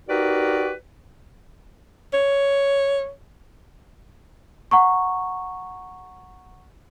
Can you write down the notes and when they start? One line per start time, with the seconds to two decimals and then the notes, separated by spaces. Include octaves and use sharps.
0.08 D#4 F#4 G4 A#4 B4 D5
2.14 C#5
4.71 F#5 A#5 C#6